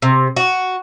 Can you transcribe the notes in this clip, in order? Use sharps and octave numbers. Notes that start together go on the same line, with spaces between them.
C3
F#4